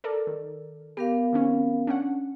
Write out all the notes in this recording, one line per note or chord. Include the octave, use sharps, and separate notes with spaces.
A4 A#4 D5
D#3
B3 G4 A#4 F5
D#3 C4 C#4
C#4 D4 F#5